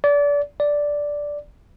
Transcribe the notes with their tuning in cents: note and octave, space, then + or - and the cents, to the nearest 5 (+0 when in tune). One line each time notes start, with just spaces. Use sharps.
D5 -30
D5 -5